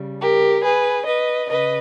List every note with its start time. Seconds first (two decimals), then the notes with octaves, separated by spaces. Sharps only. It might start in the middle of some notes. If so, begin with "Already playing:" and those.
Already playing: C#3 G3
0.21 G4 A#4
0.64 G#4 B4
1.06 B4 D#5
1.49 C#3 B4 D#5